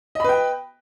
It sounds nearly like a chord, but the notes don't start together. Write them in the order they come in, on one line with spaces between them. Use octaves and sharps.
D#5 B5 B4 G5